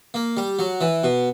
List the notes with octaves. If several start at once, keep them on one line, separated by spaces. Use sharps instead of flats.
A#3
G3
F#3
E3
B2